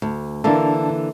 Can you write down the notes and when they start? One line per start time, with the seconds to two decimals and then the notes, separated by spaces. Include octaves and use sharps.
0.02 D2
0.44 D3 E3 A#3 D4 A5